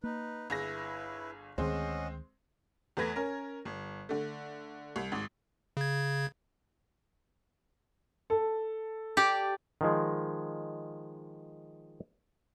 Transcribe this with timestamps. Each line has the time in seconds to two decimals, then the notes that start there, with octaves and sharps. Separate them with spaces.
0.04 A#3 D#4 B4
0.50 G1 E4 G#4 B4 A#6
1.58 D2 D#3 G#3 C4 C#4 D#5 F#5 C6
2.97 E2 A3 B4 G#6 A#6
3.16 C#4 A#4
3.65 G1
4.09 D3 A3
4.96 C2
5.12 G#1 G#2
5.77 C#3 G#6
8.30 A4
9.17 G4 D5
9.81 D#3 F3 G#3